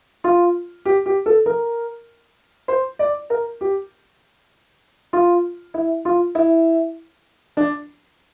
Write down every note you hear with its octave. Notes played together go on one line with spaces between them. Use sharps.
F4
G4
G4
A4
A#4
C5
D5
A#4
G4
F4
E4
F4
E4
D4